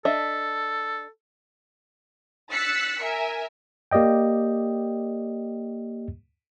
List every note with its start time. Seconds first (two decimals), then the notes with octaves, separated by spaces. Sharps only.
0.05 D4 A4 D#5 E5
2.51 E6 F#6 A6 B6 C#7
3.02 A#4 E5 G#5
3.91 A#3 G4 D5 D#5 G5